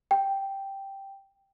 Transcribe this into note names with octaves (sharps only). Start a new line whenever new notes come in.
G5